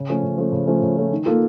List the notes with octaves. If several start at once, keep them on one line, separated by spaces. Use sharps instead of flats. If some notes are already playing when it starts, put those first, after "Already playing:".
Already playing: C#3
F3 A3 C#4
C#3
F3 A3 C#4
C#3
F3 A3 C#4
C#3
F3 A3 C#4
D#3
A#3 F4 A4